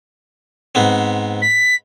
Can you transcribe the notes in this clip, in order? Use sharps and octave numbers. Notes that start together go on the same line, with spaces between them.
G#2 B3 C4
B6